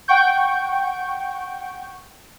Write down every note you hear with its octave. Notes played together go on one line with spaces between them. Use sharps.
F#5 G5 C#6 G6